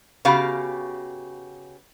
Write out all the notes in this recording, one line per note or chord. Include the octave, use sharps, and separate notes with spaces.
C#3 B3 F#4 G4 F5